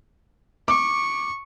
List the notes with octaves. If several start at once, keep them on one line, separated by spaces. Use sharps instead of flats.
C#6 D6